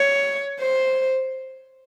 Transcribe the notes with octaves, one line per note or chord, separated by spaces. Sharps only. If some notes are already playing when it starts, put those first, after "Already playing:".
Already playing: C#5
C5